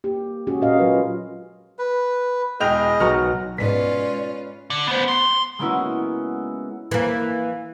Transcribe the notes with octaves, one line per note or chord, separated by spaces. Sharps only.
A#3 G4
G#3 C#4 F#4 G#4
A#2 C#4 F#4 A#4 D#5 F5
F#3 F4 B4
B4
E1 G#4 D#5 G5 F7
B1 F#4 A#5 F6
G#2 B2 G#3 C#4 F4 B4 D5 B6
D3
B3 C5
C6
G#3 A#3 B3 C#4 E4 F#4
E3 A#3